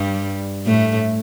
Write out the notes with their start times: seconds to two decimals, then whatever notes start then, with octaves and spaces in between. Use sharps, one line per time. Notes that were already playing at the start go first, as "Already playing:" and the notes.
Already playing: G2 G3
0.66 A2 A3